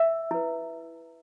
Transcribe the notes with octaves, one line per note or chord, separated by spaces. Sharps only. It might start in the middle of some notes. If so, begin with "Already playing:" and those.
Already playing: E5 E6
E4 B4